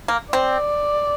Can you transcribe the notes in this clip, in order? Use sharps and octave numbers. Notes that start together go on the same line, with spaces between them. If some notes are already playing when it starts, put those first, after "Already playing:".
A#3
C4 D5